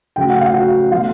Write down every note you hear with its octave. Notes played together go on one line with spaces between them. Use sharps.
C#3 F#3 A3 G5
F#5
F5
F#4 F#5
B2 F#3 A3 F4 F5